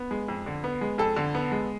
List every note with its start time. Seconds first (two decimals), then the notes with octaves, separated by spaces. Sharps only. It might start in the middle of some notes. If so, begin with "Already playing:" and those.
Already playing: B3
0.11 G#3
0.28 F2
0.46 D3
0.64 B3
0.81 G#3
0.98 F2 A4
1.16 D3
1.35 B3
1.52 G#3